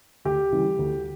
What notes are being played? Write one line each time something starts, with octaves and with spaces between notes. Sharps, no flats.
D2 G4
C#3 E3 G3
D2